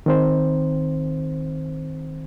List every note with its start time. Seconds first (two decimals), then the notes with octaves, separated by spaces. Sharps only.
0.06 D#3 C4 C5